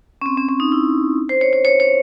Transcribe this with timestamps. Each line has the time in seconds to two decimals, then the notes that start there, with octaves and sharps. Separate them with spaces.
0.21 C#4
0.26 C4
0.38 C#4
0.49 C#4
0.60 D#4
0.72 E4
1.29 C5
1.41 C#5
1.53 C#5
1.65 C#5
1.80 C#5